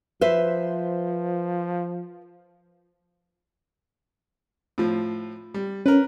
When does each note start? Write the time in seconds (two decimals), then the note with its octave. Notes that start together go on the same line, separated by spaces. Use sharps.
0.21 F3 B4 C5 E5
4.78 A2 F3
5.54 G3
5.86 C#4 A#4 B4